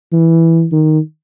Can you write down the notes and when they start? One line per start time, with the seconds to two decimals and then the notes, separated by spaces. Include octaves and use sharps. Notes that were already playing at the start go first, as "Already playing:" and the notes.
0.12 E3
0.72 D#3